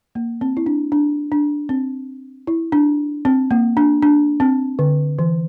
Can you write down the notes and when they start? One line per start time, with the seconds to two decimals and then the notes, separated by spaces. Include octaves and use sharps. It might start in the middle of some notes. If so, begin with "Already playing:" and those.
0.15 A#3
0.41 C4
0.57 E4
0.66 D4
0.92 D4
1.32 D4
1.69 C4
2.47 E4
2.72 D4
3.25 C4
3.51 A#3
3.77 D4
4.03 D4
4.40 C4
4.79 D3
5.19 E3